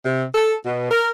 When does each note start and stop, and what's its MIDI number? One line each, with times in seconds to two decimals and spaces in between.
0.05 0.23 48
0.34 0.54 69
0.65 0.86 47
0.91 1.09 70